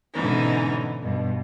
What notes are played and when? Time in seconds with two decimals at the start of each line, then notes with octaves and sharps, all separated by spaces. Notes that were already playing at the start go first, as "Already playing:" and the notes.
0.13 G#2 B2 D3 E3 C#4 D#4
1.01 G2 B2